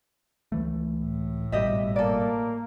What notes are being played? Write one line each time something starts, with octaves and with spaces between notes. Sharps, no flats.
C#2 E3 A3
A2
G#1 B2 G3 G4 D#5 E5
A#3 A4 D5